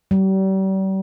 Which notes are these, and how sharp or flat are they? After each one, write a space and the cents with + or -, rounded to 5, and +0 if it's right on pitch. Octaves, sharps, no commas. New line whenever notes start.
G3 -40